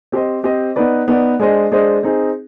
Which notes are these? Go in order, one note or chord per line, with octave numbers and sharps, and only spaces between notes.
C4 G4 C5 D#5
C4 G4 C5 D#5
B3 D#4 B4 D5
B3 D#4 B4 D5
G#3 D4 G#4 C5 D#5
G#3 D4 G#4 C5 D#5
C4 D#4 G#4